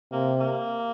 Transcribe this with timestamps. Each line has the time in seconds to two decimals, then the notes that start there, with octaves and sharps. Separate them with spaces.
0.12 C3 A#3
0.40 A#3